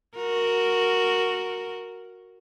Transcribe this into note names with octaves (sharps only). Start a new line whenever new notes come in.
F#4 A#4